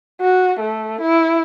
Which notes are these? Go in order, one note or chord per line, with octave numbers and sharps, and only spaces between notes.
F#4
A3
E4